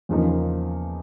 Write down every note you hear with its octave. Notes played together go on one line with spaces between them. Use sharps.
E2 C#3 F3 A#3 D#4